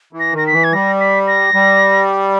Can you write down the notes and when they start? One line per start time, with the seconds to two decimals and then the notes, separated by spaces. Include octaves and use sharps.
0.13 E3
0.20 A#6
0.33 D#3 A#6
0.47 B6
0.53 E3
0.64 G#6
0.73 G3 A#6
1.00 B6
1.27 A#6
1.54 G3